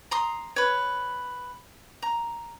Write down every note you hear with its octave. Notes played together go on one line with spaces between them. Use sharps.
A#5 C6 D#6
B4 C#5
A#5